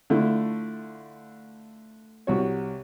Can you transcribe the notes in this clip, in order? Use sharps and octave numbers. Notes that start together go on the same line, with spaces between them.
D3 A3 E4 F4
C2 F#4 C#5